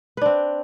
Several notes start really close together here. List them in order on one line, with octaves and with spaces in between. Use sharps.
B4 D4 C4